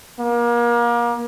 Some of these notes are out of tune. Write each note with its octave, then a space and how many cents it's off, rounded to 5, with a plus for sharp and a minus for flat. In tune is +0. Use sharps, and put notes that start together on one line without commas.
A#3 +30